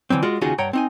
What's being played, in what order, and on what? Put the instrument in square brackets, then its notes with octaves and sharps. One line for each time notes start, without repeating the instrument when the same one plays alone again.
[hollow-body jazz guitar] D3 E3 F#3 C4
G#3 F4 F#4 D5
D#2 C#3 D#4 F4 F#4 G#4
G2 C#5 F#5 G5 A#5
C4 D#4 G#5